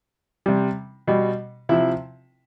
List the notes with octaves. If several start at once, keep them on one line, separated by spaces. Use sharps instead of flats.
C3 G3
B2 G3
C3 F3 E4